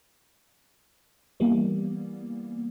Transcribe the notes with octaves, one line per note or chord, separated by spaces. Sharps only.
E3 G3 A#3 B3